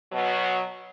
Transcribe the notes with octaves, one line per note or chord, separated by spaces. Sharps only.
B2 F#3